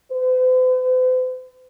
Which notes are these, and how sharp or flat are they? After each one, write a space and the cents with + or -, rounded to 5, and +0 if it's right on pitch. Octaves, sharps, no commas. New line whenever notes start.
C5 -45